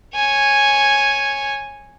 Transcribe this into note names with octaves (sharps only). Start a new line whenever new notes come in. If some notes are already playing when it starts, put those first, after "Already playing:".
C#5 G#5